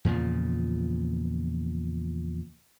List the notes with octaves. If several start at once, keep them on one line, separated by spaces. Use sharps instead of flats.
E2 A#2 C#3 F3